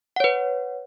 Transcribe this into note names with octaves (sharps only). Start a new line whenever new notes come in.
B4 C#5 F#5